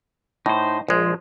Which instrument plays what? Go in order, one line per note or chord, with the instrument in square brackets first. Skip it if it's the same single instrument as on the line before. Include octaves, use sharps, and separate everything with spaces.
[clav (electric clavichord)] A2 [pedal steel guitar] D#4 C5
[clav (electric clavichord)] A#1 G#3 [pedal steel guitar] F3